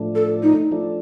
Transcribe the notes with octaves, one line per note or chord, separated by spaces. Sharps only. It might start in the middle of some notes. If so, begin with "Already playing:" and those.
Already playing: A2 F3 A3 D4
A4
D#4
F3 A3 D4